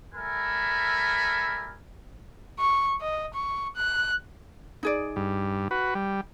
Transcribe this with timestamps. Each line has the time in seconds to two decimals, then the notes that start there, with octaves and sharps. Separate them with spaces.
0.14 G3 A4 A#4 E5 G#5 B5
2.59 C#6
3.01 D#5
3.34 C#6
3.76 F#6
4.83 D#4 G#4 D5
5.16 G2
5.71 F#4 B4
5.95 G3